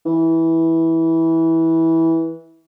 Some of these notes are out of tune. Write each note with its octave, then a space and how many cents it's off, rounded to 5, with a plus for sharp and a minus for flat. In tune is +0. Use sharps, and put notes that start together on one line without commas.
E3 -15